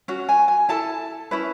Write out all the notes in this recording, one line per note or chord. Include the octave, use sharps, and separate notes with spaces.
C#4 F#4
G#5
G#5
E4 A4 A5
C#4 E4 B4